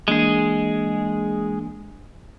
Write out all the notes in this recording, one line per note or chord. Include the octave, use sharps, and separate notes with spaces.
E3 G#3 A#3 D4 G#4